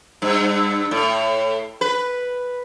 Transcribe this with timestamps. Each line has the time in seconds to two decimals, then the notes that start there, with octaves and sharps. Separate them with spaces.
0.22 G2
0.91 A2
1.81 B4